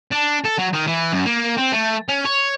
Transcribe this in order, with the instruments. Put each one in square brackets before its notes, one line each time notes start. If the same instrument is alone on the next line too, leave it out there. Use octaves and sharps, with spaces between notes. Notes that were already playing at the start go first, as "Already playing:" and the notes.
[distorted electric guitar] D4
A4
F#3
D#3
E3
F#2
A#3
C4
A3
C#4
C#5